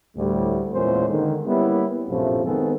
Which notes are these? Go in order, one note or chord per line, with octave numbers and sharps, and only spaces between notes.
D2 A2 G3
E2 A#2 G#3 A#3 C#4 C5
G#2 D3 D#3
G3 A#3 B3 C#4 E4
A#1 F#2 A2 C3 F3 A3
D#3 G#3 B3 C4 G#4 A4